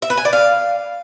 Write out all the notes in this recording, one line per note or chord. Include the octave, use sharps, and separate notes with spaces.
E5
B4
G#5
D5
F5